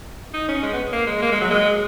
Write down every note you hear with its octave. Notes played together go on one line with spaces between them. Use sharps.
D#4
C#4
G#3
B3
A#3
G#3
A#3
G#3
F#3
G#3